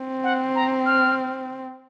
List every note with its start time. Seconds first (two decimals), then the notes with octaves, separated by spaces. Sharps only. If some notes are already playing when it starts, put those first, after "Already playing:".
Already playing: C4
0.23 F#5
0.55 A#5
0.86 F6